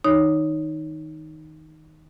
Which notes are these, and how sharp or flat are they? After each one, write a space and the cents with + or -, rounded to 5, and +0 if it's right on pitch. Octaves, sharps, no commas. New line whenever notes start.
D#3 +20 D#4 +0 C#5 +10